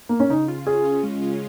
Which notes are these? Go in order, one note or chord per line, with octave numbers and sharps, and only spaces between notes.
A#3
C#4
C#3 D#4
F4
C#4 G#4
C#4
G#3
F4